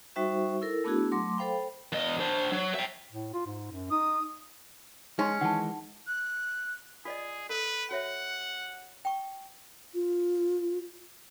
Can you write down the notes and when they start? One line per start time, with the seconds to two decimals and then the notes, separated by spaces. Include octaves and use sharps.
0.16 G3 D#4 F#4 C5 E5 C#6
0.62 E4 A4 A#4
0.84 A3 B3 D4 E4 F#4 G#4
1.11 F#3 A3 C6 D6
1.37 A4 C5 F5 G5 B5
1.92 E2 D#5
2.20 D4 C5
2.52 F#3
2.74 E5 G5
3.12 A2
3.33 F4
3.46 G#2
3.72 F#2
3.91 D#4 D#6
5.19 G#3 C#4 D#4 C6
5.41 D#3 E3 G#3 F#5 A5
6.07 F#6
7.05 F4 G#4 D5 D#5
7.50 A4 B4
7.91 F#4 C#5 E5 F#5
9.05 G5 C#6
9.95 F4